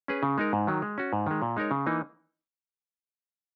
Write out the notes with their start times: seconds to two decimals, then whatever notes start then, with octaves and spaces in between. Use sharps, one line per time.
0.08 C#4 G#4 B4
0.23 C#3
0.38 G#3 D#4 A#4
0.53 G#2
0.67 D#3 F#3
0.82 G#3
0.98 C#4 F#4
1.13 G#2
1.27 D#3 G#3
1.42 A#2
1.57 G#3 D#4 A#4 C#5
1.71 C#3
1.86 E3 A#3 D#4